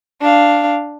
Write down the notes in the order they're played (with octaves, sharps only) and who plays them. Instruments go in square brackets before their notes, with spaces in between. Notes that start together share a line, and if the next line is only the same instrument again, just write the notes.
[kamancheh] D4 F5